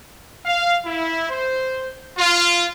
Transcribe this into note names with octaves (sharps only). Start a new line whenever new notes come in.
F5
E4
C5
F4